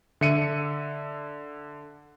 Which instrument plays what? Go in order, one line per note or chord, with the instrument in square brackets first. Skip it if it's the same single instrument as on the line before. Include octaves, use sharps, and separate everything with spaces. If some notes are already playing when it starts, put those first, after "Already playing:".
[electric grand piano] D3 E5 C#7 D#7